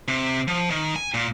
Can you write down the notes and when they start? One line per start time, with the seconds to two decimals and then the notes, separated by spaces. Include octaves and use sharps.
0.08 C3
0.48 F3
0.70 D#3
0.96 G#5
1.14 A#2